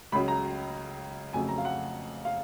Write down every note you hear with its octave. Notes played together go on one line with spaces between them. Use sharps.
C#2 C#3 F#3 B5
A#5
F2 C#3 F#3 A3 G#5
A#5
F5
F#5
F5